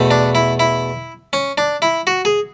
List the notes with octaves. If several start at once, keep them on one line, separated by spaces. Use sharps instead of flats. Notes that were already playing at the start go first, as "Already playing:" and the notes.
Already playing: E2 B2 A3
D4
E4
E4
C#4
D4
E4
F#4
G#4